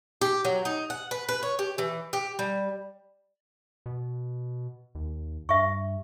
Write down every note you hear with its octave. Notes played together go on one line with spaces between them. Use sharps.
G4
F#3
D#4
F#5
B4
B4
C#5
G4
E3
G4
G3
B2
D#2
G2 E5 C#6